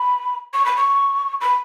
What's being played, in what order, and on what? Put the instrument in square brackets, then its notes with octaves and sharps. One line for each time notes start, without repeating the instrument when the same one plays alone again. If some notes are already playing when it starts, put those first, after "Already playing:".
Already playing: [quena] B5
C#6
B5
C#6
B5